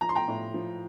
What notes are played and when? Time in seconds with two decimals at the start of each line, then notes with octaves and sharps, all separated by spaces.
0.01 F3 A#5
0.09 C6
0.15 G5 A#5
0.28 A2
0.54 F3